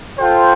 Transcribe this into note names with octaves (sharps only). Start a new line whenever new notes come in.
F4 A4 C5 G5